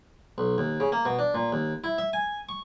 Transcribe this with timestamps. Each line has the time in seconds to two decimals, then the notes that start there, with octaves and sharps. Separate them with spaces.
0.38 B1
0.58 D#2
0.80 C#3
0.92 A#3
1.05 B2
1.19 D4
1.34 A#2
1.52 D#2
1.84 E4
1.98 E5
2.13 G#5
2.49 C#6